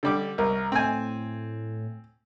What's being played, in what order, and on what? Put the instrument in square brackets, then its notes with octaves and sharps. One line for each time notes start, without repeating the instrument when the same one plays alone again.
[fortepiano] D3 G3 D6
[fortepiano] C2 [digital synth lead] A#4
[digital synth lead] A2 [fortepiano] C4 G#5